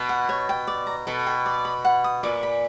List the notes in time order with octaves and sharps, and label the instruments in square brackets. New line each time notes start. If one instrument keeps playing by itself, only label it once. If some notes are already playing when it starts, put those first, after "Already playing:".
Already playing: [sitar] B2
[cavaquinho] F#5
C#5
G5
D5
A#5
[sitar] B2 [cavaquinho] A4
[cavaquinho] G5
D5
B5
F#5
D#6
[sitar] A#2 [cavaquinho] D5
[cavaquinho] B5